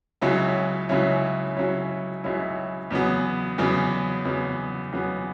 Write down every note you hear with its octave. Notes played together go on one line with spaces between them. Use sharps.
C#2 C#3 F#3 C#4 E4
C#2 C#3 F#3 C#4 E4
C#2 C#3 F#3 C#4 E4
C#2 C#3 F#3 C#4 E4
E2 C#3 F#3 B3
E2 C#3 F#3 B3
E2 C#3 F#3 B3
E2 C#3 F#3 B3